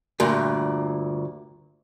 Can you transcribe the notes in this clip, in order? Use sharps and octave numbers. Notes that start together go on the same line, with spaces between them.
D2 G2 A#2